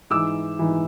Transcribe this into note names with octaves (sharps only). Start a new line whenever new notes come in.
G#2 E3 D6 E6
G#2 E3